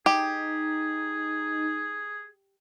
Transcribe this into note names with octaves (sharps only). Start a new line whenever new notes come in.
D#4 G4 G#4